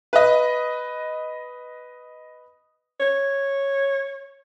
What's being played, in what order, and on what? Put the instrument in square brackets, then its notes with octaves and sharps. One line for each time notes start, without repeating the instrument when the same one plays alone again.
[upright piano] B4 D#5
[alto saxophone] C#5